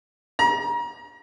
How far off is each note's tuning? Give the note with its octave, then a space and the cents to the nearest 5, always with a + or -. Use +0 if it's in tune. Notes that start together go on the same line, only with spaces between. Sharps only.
A#5 +35